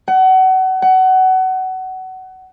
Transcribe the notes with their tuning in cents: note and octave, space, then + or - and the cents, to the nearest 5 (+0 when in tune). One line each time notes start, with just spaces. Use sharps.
F#5 +30
F#5 +25